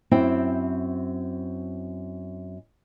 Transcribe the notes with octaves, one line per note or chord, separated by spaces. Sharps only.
F#2 C4 E4 G5